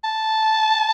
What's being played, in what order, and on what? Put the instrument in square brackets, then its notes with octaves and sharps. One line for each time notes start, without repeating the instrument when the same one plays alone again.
[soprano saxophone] A5